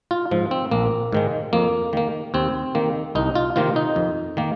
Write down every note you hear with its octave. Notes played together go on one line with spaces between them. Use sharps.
F4
G#2 F3
C4
A#1 A#3
G#2 D#3 G#3
F2 A#3
D#3 A#3
D#2 C4
D#3 A#3
C2 D#4
F4
C3 D#3 A#3 F4
D#4
F2
D#3 A#3